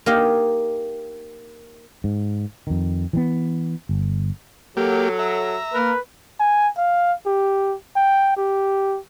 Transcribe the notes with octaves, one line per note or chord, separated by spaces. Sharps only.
A#3 D#4 G4 F5
G#2
F2 D#3
E3 F#3 B3
G1
F#3 A#3 G4 A4
E5 A#5
A#3 A#4 B4
G#5
F5
G4
G5
G4